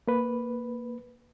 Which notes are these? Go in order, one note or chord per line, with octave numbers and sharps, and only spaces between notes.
A#3 B4